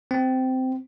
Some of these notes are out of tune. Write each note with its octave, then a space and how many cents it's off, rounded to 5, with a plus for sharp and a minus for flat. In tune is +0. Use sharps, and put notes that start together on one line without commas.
C4 -15